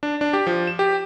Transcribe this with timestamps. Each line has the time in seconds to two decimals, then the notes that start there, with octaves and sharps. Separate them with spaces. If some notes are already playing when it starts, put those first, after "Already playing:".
0.03 D4
0.21 D4
0.33 G4
0.47 F3
0.67 E7
0.79 G4